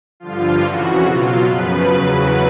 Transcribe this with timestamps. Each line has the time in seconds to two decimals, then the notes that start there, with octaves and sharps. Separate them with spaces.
0.20 G2 D3 F3 F4
0.62 F2 C#3 E3 F#4
1.03 B2 F#3 F4
1.46 F#2 C#3 F3 B4
1.87 E2 C#3 F#3